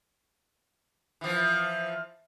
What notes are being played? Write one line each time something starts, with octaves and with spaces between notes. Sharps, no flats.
E3 F3